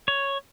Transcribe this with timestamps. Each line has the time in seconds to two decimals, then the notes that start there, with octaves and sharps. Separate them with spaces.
0.08 C#5